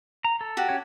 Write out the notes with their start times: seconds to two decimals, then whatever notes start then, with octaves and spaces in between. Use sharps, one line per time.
0.25 A#5
0.41 A4
0.57 F#4 G4
0.69 C#4 C#5